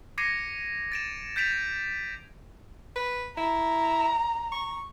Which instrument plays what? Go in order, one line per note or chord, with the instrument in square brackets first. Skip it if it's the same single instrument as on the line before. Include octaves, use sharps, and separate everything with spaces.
[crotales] D6 G#6 A#6 C7 C#7 D#7
A6 D7 E7
G6 A6 B6 D7 E7 F7
[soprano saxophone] B4
[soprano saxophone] E4 [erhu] A#5
[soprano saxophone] C#6